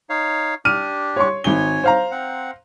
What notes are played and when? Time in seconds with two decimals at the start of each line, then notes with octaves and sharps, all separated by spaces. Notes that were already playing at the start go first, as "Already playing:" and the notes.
0.09 D#4 C#5 F5
0.65 D4 G4 F6 D#7
1.16 C#5 C6 C#6
1.44 G#1 C#5 G#5 G7
1.84 C5 F5 A#5
2.11 C4 F#5